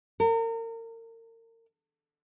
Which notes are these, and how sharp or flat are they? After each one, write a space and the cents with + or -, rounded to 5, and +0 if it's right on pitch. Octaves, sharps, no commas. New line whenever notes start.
A#4 -35